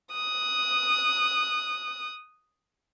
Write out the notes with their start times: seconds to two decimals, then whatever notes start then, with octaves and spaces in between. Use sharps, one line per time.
0.13 D#6 F#6